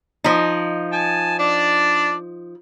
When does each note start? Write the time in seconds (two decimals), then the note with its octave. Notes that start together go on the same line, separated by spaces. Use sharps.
0.24 F3 D#4
0.93 G#5 A5
1.39 D4 D5